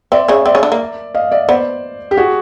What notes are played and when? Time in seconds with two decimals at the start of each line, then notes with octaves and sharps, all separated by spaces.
0.12 C4 D5 E5
0.28 C#3 C#4 D5 E5
0.46 C4 D5 E5
0.55 C#3 C#4
0.63 D3 D4
0.72 A#3
1.14 D#5 F5
1.31 D5 E5
1.48 B3 C5 D5
2.11 G4
2.17 F#4 G#4